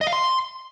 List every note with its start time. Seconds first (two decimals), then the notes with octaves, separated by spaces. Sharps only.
0.01 D#5
0.07 F5
0.13 C6